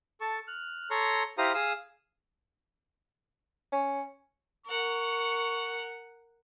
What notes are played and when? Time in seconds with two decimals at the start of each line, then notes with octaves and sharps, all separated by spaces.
0.21 A4 A5 C#6
0.48 F6 F#6
0.91 A4 C#5 A#5 C6 C#6
1.38 E4 G4 C5 F5 A#5 D#6
1.54 G#4 F5 D#6 E6
3.72 C#4
4.66 A#4 F#5 C#6